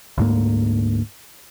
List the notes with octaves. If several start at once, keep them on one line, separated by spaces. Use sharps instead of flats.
D2 G#2 A#3